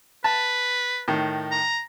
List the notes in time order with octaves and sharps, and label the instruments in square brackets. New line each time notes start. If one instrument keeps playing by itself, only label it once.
[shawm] B4 [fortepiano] A5
[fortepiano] A2 D#3
[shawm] A#5